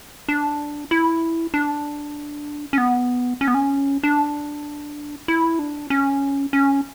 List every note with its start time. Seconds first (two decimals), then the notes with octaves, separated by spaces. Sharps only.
0.28 D4
0.91 E4
1.54 D4
2.73 C#4
2.78 B3
3.41 C#4
3.48 B3
3.54 C#4
4.03 D4
5.28 E4
5.59 D4
5.90 C#4
6.53 C#4